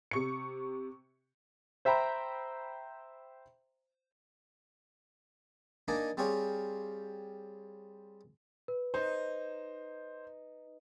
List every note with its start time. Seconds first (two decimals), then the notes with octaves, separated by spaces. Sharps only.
0.11 C3 C#6 C#7
1.85 C5 E5 G5 A#5 B5
5.88 A#3 D4 D#4 D5 D#5 G#5
6.17 G3 C4 F4 G4 G#4 C#5
8.68 B4
8.94 D#4 C5